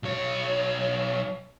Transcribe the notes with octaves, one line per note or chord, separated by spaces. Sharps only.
B1 C#5